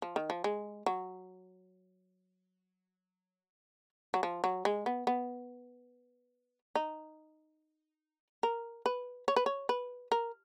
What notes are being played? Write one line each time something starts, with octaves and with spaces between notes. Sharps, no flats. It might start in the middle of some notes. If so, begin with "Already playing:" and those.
F3
D#3
F3
G#3
F#3
F#3
F3
F#3
G#3
B3
B3
D#4
A#4
B4
C#5
B4
C#5
B4
A#4